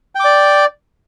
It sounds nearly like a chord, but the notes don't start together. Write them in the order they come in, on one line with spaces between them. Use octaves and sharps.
G5 D6 D5